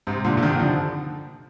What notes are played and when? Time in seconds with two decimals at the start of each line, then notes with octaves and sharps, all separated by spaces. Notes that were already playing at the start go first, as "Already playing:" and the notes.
0.07 G#2 C3
0.25 A#2 D3
0.37 D3
0.42 C3 D#3
0.59 D3 F3